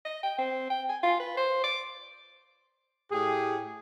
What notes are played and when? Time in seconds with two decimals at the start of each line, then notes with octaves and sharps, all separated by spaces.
0.05 D#5
0.23 G5
0.38 C4
0.70 G5
0.89 G#5
1.03 F4
1.20 B4
1.37 C5
1.64 D6
3.12 A2 G4 G#4